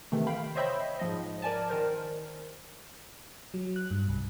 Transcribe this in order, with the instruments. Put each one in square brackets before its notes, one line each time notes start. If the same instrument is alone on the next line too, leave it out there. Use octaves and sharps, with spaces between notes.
[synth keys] C3 D#3 E3 A3
F5 G5 B5
C5 C#5 D#5 E5 G5 B5
G#2 F3 D#5
A#4 D5 G#5 A5
D#3 A#4 C5
[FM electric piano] F#3
F#6
G2
C2